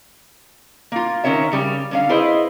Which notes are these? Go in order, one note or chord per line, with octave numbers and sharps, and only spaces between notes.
A#3 F4
D#3 C#4 A#4 C#5 E5
C#3 G3 C#4
D3 C#4 F5
E4 G#4 B4 C5 D#5